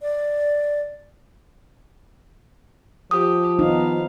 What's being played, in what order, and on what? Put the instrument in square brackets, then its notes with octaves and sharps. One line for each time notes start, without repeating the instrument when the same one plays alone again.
[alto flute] D5
[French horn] F3 [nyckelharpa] G4 [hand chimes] D#6
[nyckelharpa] B3 F5 [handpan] D#4